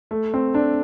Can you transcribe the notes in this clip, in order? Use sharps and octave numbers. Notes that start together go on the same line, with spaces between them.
A3
C4
D4